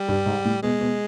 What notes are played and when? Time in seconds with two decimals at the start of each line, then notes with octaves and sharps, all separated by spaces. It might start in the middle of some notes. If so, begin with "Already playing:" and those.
Already playing: G3
0.08 G2
0.26 G#2
0.45 A2
0.63 B2 G#3
0.81 B2